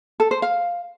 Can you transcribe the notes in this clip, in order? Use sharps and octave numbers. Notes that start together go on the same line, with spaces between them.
A4
C5
F5